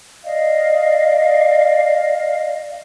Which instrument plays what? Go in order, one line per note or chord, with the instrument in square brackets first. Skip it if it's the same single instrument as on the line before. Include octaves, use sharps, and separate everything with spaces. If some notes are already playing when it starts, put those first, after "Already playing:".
[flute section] D5 D#5 F5